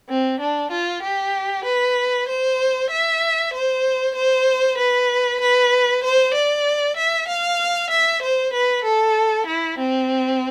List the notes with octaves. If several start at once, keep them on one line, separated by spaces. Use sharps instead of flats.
C4
D4
F4
G4
B4
C5
E5
C5
C5
B4
B4
C5
D5
E5
F5
E5
C5
B4
A4
E4
C4